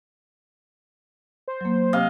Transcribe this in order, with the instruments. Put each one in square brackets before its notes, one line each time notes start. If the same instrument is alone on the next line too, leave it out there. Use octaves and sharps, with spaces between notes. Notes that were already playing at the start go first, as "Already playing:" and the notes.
[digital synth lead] C5
[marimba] F#3 A#3
[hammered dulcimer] C3 D#5 F5